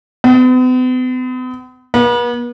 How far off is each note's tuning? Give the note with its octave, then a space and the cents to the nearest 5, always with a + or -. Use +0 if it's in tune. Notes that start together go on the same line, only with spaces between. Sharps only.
B3 +45
B3 -40